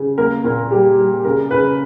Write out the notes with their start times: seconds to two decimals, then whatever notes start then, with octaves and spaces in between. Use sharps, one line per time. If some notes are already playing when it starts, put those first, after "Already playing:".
Already playing: C#3
0.18 A#3 A#4
0.44 A#2 A#4
0.71 G3 G4
0.98 G3
1.24 C#3 A#4
1.51 C#3 B4